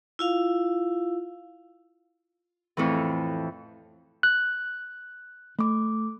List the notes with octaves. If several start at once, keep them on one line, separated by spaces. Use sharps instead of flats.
E4 F4 F5
F2 A2 E3
F#6
A3 D6